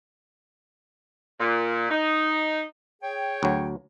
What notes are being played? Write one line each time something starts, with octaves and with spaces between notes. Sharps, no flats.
A#2
D#4
G#4 C#5 G5
D2 F#3